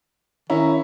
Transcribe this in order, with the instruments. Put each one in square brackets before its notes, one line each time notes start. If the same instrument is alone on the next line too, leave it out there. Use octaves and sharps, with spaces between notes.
[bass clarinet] D#3 [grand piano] C#4 E4 A#5